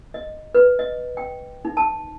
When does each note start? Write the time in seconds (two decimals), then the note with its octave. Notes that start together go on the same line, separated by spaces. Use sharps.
0.14 D#5
0.54 B4
0.79 D#5
1.17 G5
1.65 D#4
1.77 A5